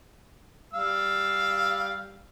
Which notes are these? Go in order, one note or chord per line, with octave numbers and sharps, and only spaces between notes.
G3 F5 E6